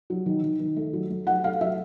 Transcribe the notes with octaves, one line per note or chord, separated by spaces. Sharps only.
F#3
D#3
D#3
D#3
A3
F#3
A3
F#3 F#5
A3 F5
F#3 E5